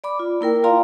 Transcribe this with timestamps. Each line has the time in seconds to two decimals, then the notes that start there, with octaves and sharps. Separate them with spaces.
0.04 D5 B5 D6
0.19 F4
0.41 A#3 E4 A#4 G5
0.64 F4 D5 F5 A#5 C6